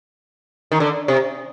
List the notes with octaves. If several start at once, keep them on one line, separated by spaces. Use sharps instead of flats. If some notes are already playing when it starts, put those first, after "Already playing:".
D#3
D3
C3